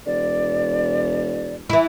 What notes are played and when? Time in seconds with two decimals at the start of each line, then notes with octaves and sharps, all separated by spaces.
0.06 E1 D5
1.70 E3 E4